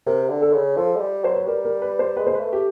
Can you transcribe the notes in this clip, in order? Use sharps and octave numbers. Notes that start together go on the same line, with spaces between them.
C3 A#4
D3
A4
C#3
F3 A4
G#3
G3
F#3 C5
B4
G3 A#4
A#4
B4
C5
G#3 B4
C5
B4
A3
G4